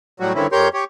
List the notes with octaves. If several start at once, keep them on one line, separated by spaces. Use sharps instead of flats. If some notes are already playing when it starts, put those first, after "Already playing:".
A2 F#3 G3 F#4
G2 D3 D#3 C4 C#4 E4
F2 G4 A#4 C#5 C6 G6
G4 C#5